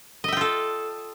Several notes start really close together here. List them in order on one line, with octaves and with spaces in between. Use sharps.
D#5 E5 G5 F4 A4